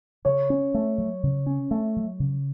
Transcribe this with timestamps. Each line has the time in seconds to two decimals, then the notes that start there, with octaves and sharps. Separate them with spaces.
0.25 C#3 C#5
0.50 C#4
0.74 A3
0.98 F#3
1.23 C#3
1.46 C#4
1.71 A3
1.96 F#3
2.20 C#3